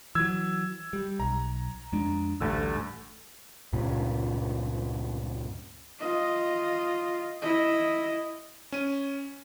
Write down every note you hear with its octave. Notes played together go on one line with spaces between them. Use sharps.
E3 F#3 E6 G#6
G3
B1 A#5
F2 G#3 D4
A1 D2 G2 D3 E6
C#2 G2 A#2 C#3
F4 D#5
E4 D#5
C#4 D#7